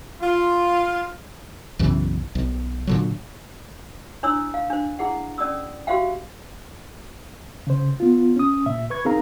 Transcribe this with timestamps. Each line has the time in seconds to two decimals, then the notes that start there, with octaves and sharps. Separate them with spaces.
0.21 F4
1.79 B1 F#2 C#3 E3
2.35 B1
2.87 A#2 D3 F#3
4.23 D4 E4 C#5 D#6 E6
4.54 F5
4.70 D4 C5
4.99 E4 G#4 F#5
5.38 C#4 D5 D#6 E6
5.87 F#4 G4 C5 E5 F5 G5
7.67 C#3 C5
8.00 B3 F4
8.36 C#4 D#6
8.66 A#2 E5
8.90 B4 C#6 G#6
9.05 C4 D#4 G#4 A#4 F5 A#5